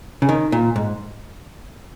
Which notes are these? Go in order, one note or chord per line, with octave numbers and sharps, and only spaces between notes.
C#3
D#3
A#2
G#2